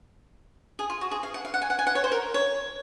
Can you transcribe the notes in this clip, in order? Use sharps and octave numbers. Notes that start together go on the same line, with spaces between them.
G#4
F4
F#4
G#4
F5
F#5
F5
F#5
G#5
F#5
G#5
F#5
C#5
C5
A#4
C#5